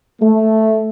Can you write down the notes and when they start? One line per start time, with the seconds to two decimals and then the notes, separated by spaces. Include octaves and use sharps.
0.22 A3